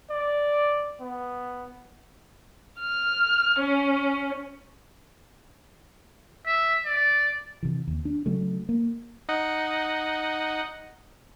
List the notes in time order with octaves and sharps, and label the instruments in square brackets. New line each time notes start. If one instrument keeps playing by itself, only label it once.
[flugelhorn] D5
B3
[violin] F6
C#4
[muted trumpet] E5
D5
[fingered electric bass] C3 E3
D#2
D4
C#3 F#3 A3
A#3
[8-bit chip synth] D#4 D#5 F#5